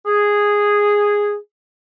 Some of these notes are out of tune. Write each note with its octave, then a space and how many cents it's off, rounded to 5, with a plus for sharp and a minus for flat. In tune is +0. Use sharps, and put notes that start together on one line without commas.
G#4 -10